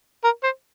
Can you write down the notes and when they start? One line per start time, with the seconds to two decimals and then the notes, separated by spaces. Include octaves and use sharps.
0.24 A#4
0.43 C5